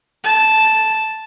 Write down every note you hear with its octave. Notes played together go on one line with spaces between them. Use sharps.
A5